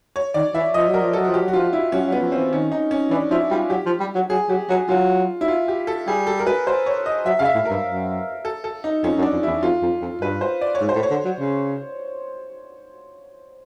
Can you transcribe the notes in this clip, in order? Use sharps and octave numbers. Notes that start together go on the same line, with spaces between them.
C#5
D#3 D5
E3 E5
F3 D#5
F#3
A#4
F3
F#3 A4
F#4
F3
G4
F#3
F#4
F3 F4
E4
F#3 C#4
F#3
B3
F3
C4
E3
D#3 C#4
D#4
C#4
E3 D4
F3 E4
G3 F4
F#3 G4
F3
G3
F#3
F#3 G#4
F#3 G4
F#3 F#4
F#3 F4
E4
F4
G4
A4
G3 G#4
A4
A#4
B4
C5
C#5
D#5
F#3 E5
C#3 F5
E5
A2
A#4
G2
F#2
A4
A4
D#4
F2 C#4
F#2
D4
F2
E2 E4
F2 F4
F2
F2
G2 B4
C5
D5
C#5
G#2
C5
A2
C#5
D3
F#3
C#3